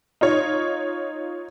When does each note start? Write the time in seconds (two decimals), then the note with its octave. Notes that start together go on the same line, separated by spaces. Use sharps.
0.21 D#4 F4 C#5